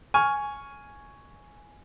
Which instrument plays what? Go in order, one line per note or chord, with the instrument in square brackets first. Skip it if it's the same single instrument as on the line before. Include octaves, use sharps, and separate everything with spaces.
[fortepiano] G#5 C#6 F6